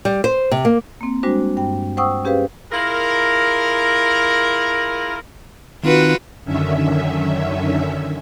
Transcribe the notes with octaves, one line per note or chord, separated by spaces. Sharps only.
G3
C5
C3
A#3
A#3 C4
G3 G#3 D4 F#4 C5
G2 G5
C5 F#5 G5 C#6 D#6 E6
C#4 G4 G#4 B4 C5 F5
E4 F4 G#4 A#4
D#3 C4 D#4 F4 F#4 B4
F#2 D3 D#3 C#4 E5